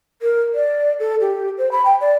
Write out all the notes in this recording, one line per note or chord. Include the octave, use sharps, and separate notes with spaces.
A#4
D5
A4
G4
C5
B5
G5
D5